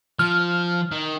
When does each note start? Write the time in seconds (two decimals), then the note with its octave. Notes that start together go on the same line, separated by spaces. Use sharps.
0.19 F3 F6
0.92 D#3